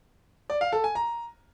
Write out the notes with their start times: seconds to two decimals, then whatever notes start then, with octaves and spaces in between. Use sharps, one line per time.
0.50 D5
0.61 F5
0.72 A4
0.84 G#5
0.95 A#5